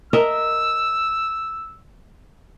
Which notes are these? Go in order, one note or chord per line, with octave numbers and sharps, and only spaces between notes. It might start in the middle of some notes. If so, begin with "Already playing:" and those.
A#4 D#5 E5 E6